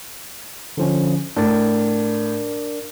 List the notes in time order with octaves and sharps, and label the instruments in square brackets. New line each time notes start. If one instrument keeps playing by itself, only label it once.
[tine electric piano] D3 F3 C#4
[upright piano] A2 [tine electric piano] D4 A#4 D5